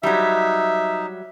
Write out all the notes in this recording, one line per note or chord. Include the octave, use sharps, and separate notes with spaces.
F#3 G3 D#4 E5